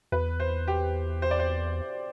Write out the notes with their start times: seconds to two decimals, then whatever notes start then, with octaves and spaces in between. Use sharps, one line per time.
0.12 E2 B4
0.40 C5
0.68 G4
1.22 C5
1.31 D5
1.39 C5